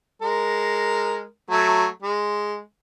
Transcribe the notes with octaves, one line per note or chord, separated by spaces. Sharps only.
G#3 A#4
F#3 A3
G#3